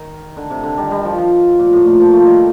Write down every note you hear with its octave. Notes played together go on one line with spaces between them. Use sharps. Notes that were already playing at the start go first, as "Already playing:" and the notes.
Already playing: D#3
D3
C3
D3
D#3 G3
D#3 G3
F3
F3
A#2
A2
A#2
F3
F3 A3
D#3 G3